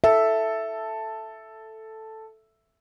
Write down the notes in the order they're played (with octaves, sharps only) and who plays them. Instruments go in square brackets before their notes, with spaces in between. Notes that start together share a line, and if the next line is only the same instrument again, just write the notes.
[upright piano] A4 [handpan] E5